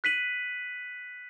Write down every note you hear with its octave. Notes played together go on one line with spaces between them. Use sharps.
F#6 B6 D#7 F#7